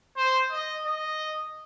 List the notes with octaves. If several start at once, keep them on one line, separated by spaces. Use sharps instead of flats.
C5
D#5
D#5